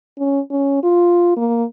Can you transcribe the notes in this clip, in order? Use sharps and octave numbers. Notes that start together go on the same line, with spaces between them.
C#4
C#4
F4
A#3